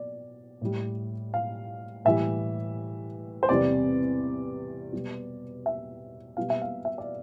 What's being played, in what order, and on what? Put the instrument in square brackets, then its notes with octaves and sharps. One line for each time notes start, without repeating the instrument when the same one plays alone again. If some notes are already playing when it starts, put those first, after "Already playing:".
Already playing: [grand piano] B2 D5
A2 G3
F5
A2 E3 G3 E5
C5
E2 C3 G3 D5
B2 G3
E5
B2 G3 F5
E5
F5
E5
D5